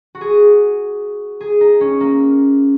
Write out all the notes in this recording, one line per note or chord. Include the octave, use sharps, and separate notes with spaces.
F#4
G#4
G#4
D#4
C#4
A#3